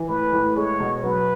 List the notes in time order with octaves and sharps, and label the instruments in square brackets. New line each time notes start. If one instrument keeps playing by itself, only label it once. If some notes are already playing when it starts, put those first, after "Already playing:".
Already playing: [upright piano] E3
[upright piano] A2 [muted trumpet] B4
[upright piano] A2
[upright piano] G#3 [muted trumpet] C#5
[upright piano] B2
[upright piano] F#3 [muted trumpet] B4